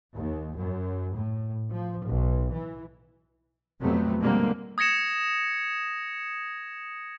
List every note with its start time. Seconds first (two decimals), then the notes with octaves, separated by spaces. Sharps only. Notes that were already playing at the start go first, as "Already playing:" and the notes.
0.15 D#2
0.57 F#2
1.16 A2
1.70 F3
2.05 B1
2.52 E3
3.80 F2 C3 F#3 A3 B3
4.21 B2 D3 G3 G#3 A#3 C4
4.78 D#6 G#6 A#6 C#7 E7